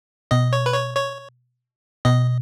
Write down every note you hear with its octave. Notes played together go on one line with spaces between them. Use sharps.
B2 D#5
C#5
B4
C#5
C#5
B2 D#5